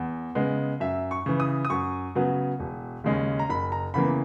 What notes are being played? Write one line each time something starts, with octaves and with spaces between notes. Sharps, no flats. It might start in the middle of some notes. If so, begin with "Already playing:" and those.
Already playing: E2
C#3 G#3 B3
F#2 E5
C#6
C#3 E3
D#6
D#6
F#2 C#6
C#3 F#3 B3
E1
D#2 C#3 G#3 C#4
A#5
F#1 B5
A#5
E2 C#3 E3 A#3 B5